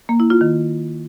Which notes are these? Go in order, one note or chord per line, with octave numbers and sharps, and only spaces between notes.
A#3
E4
F4
D#3